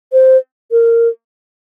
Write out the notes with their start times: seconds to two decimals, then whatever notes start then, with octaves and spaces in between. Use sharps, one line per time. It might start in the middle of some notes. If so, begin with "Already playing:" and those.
0.13 C5
0.71 A#4